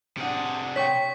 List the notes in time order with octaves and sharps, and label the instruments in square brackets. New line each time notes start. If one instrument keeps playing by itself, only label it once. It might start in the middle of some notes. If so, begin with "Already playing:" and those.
[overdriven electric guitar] C3 G#4 [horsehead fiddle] D4 F#5
[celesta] C#5 G5 [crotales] C#6 B6